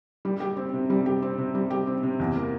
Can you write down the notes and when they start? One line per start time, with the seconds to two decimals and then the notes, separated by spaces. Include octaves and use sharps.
0.25 G3
0.40 G4
0.57 C4
0.74 C3
0.90 G3
1.06 G4
1.22 C4
1.38 C3
1.55 G3
1.70 G4
1.87 C4
2.03 C3
2.20 E2
2.36 A#3